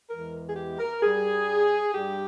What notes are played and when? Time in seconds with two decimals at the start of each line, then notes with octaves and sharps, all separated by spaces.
0.09 E2 E3 G#3 A#4
0.49 G#4
0.55 G4
0.79 A#4
1.01 G2 G3 G#4
1.94 G2 G3 G4